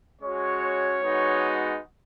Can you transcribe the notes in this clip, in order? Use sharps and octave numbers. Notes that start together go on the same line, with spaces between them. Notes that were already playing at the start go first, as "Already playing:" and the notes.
G#3 C#4 F#4 C#5
G#3 B3 D#4 F#4